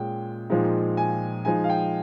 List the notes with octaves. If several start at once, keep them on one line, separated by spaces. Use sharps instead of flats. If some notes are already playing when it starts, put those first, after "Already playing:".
Already playing: A#2 G#3 C#4 G5
A#2 F3 G#3 D#4
G#5
F3 G#3 D#4 G#5
F5
G5